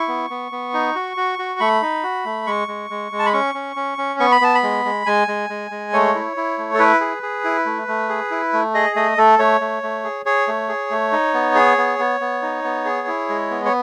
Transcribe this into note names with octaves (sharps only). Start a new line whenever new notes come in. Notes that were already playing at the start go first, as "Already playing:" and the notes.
Already playing: E4 C#6
B3
B3
B3
D#4
F#4
F#4
F#4
A3 B5
D#4
F#4
A3
G#3 C#6
G#3
G#3
G#3
A5
B5
C#4 C#6
C#4
C#4
C#4
B3 C#6
B5
B3 A5
B5
G#3
G#3
G#3 G#5
G#3
G#3
G#3
A3 C#5
E4
E4
A3
A4
E4 B4
G#4
G#4
E4
A3
A3
G#4
E4
A3
G#4 D#5
A3 D#5
A3 A4
A3 C#5
A3
A3
G#4
G#4 C#5
A3
G#4
A3
D#4
B3
G#4
B3
B3
B3
D#4
B3
G#4
E4
G#3
B3
C#5